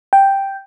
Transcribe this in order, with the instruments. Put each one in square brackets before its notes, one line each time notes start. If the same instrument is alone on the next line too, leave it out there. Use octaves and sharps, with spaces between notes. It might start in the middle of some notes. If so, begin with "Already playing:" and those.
[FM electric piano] G5